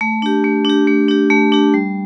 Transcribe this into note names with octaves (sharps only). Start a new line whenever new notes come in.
A3
D4 G4
A3
D4 G4
A3
D4 G4
A3
D4 G4
G3